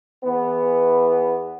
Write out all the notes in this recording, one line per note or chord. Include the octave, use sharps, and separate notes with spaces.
E2 E3 B3